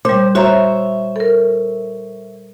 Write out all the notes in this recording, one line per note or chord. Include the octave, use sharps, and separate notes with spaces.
A#2 G3 C5
F#4 C5 C#5 E5 A#5
A4 A#4